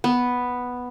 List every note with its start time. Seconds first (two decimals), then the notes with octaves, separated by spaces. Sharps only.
0.04 B3